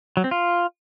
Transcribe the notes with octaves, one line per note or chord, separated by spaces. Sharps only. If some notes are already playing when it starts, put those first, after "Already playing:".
F#3
C4
F4